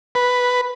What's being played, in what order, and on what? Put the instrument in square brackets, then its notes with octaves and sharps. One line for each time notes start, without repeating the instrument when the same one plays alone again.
[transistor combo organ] B4